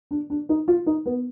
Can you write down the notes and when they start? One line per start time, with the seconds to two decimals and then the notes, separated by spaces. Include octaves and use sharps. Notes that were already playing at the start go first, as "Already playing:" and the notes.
0.11 D4
0.30 D4
0.49 D#4
0.68 F4
0.86 D#4
1.06 B3